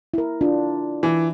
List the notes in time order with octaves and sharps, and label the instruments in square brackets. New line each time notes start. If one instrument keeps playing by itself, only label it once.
[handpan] E4 A#4
D4 F4
[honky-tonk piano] E3